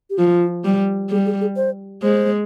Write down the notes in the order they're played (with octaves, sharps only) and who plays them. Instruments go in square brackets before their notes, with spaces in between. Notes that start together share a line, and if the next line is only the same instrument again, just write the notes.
[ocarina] G4
[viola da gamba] F3 [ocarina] F4
[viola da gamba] G3
[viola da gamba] G3 [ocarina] G#4
[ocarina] G#4
G#4
C5
[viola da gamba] G#3 [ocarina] C5